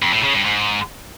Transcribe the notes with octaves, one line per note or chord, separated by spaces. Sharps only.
F2
A2
C#3
G2
G#2